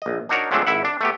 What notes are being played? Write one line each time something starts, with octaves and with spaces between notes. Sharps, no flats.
A#1 D#5
D4 D#4 F#4 A#4 C#5
F3 F#3 G#3 A3 C4 D4
G#1 E4 E5 F#5
D4
A3 B3 G4